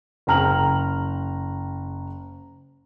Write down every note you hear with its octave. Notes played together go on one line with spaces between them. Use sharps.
F#1 G5 A#5 F6 F#7